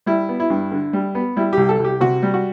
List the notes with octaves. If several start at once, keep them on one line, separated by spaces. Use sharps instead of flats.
G3 E4
B3
E4
G2
D3
G3
B3
G3 E4
C2 G4
A4
C2 G4
C3 F#4
G3
F#4